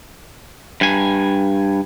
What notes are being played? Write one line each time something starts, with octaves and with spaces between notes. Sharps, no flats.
G2 G#5